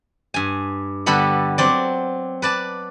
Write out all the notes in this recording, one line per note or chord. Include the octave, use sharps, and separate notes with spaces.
G2 G#5
D3 G3 B3 A4 B5
F#3 C4 D5
B4 D5 A5